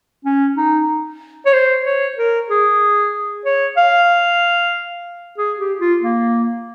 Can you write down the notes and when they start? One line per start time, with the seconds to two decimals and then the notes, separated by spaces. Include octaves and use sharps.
0.25 C#4
0.57 D#4
1.46 C#5
1.53 C5
1.85 C#5
2.17 A#4
2.49 G#4
3.45 C#5
3.77 F5
5.38 G#4
5.59 G4
5.80 F4
6.02 A#3